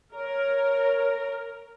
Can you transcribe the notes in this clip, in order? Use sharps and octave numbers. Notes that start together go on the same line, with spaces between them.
A#4 C#5